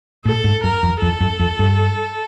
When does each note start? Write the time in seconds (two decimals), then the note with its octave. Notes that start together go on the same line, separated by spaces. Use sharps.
0.25 A2 A4
0.44 G#2
0.64 F#2 A#4
0.83 F2
1.01 F2 A4
1.21 F#2
1.39 F2
1.59 G2